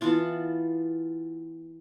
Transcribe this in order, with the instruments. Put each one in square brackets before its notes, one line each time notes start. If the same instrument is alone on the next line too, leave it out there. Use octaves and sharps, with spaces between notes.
[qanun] E3 B3 F4 A5